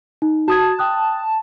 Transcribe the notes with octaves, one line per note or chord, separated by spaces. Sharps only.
D#4
F#4 A5 D#6 G#6
G5 D#6 F#6